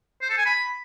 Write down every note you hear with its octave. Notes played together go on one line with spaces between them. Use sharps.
C5
A4
G#5
B5